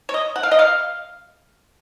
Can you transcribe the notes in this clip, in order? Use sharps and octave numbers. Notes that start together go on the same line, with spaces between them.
C#5
D#5
F#5
F5
D#5
F5